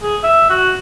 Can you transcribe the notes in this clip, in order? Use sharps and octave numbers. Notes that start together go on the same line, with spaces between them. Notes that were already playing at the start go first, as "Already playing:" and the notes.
G#4
E5
F#4